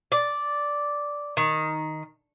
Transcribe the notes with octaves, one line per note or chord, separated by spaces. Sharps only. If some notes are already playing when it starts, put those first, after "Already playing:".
D5
D#3